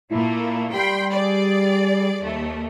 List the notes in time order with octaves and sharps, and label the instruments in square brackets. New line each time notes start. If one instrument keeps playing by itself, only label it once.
[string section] A#2 A3 A#3 [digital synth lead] E4
[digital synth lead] G3 [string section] G5 B5 C6
[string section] G#4 D5
D#2 A3